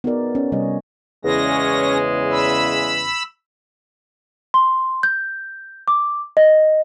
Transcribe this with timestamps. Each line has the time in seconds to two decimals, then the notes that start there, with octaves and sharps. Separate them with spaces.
0.04 B3 D#4 F#4 G#4 A#4 D5
0.35 C#4
0.52 C3 G3 C#5 D#5
1.25 E2 C#3 G#3 C#4 A#6
2.30 B5 E6
4.54 C6
5.03 G6
5.88 D6
6.37 D#5